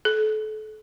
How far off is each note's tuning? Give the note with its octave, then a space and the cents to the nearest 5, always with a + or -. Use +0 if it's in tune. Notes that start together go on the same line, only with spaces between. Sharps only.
A4 -35